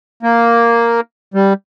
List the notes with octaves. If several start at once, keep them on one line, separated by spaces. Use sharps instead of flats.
A#3
G3